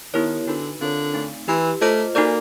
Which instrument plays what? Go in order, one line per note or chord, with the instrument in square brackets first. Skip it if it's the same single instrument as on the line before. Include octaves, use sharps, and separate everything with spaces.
[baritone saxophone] D#3 [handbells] B3 E4 G4 A#4 C#5
[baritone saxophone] D3 [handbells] D#4 F#4 B4
[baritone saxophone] D3 [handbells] C4 F4 A#4 C#5
[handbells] A3 C4 D#4
[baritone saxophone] E3 [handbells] E4 G4 B4
[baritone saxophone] A3 [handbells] F4 A4 C5 D#5
[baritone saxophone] A#3 [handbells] D#4 F#4 A4 D5